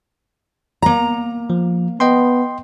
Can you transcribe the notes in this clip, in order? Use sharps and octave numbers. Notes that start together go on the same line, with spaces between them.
A#3 A#5
F3
B3 D#5 G5 C6